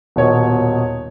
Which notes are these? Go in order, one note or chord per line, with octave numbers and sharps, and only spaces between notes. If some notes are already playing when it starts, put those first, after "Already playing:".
D#1 B2 C#5 D#5